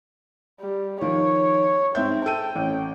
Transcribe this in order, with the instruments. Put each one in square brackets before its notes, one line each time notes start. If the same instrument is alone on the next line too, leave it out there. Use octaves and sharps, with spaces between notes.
[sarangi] G3
[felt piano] D#3 F3 [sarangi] C#5
[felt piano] G#2 E5 G6 [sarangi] C4
[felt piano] A4 D#7 [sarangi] G5
[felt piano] A1